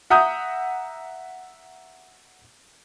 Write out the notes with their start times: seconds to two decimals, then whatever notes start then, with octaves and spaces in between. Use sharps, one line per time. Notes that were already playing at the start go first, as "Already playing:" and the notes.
0.10 E5 F#5 A#5 D#6 G6